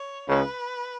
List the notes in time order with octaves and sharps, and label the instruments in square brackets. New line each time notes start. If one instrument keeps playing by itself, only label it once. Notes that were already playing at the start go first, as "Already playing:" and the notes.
Already playing: [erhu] C#5
[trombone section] C#2 C#3 [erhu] B4